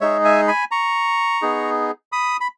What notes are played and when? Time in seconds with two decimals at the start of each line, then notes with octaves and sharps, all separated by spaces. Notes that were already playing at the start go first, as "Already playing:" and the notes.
0.01 G#3 D#4 G#4 C#5 E5
0.24 E5 G#5
0.48 G#5 B5
0.71 A#5 C#6
1.42 B3 D#4 G#4
2.12 B5 D#6
2.40 B5